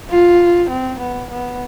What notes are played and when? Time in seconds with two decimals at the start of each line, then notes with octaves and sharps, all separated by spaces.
0.10 F4
0.70 C4
1.00 B3
1.30 B3